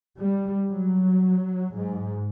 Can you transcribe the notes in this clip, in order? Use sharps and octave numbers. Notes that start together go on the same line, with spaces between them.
G3
F#3
G#2